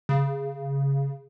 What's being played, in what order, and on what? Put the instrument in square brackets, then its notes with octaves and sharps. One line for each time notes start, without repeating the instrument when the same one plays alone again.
[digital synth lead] C#3